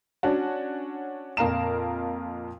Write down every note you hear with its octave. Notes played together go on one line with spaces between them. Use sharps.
C#4 D4 F#4
F2 A#2 A#4 F5 A#5 E7